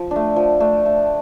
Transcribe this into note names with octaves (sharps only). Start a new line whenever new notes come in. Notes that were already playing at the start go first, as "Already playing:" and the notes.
Already playing: F3
A3 D4
F3
A3 D4
A3